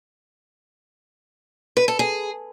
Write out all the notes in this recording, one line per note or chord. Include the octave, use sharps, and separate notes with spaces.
B4
A4
G#4